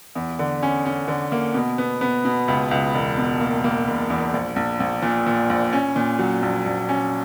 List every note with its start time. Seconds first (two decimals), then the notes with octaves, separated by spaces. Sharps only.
0.15 E2
0.39 D3
0.63 C#4
0.86 C#4
1.08 D3
1.32 A#3
1.54 B2
1.78 B3
2.01 B3
2.25 B2
2.48 C#2
2.71 C#2
2.94 E1
3.17 B2
3.41 A#3
3.64 A#3
3.88 E1
4.10 E2
4.33 A#1
4.56 A#1
4.80 A#1
5.02 A#2
5.26 A#2
5.50 A#1
5.73 C#4
5.96 A#2
6.19 F#3
6.42 A#1
6.66 A#1
6.89 C#4